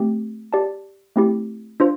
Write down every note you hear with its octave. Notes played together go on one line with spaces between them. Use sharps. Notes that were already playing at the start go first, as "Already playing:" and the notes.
Already playing: A3 C4 G4
G4 D5 A5
A3 C4 E4 G4
D4 F4 C5